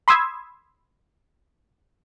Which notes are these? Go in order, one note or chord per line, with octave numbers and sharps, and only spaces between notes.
B5 C6 D#6 E6 G#6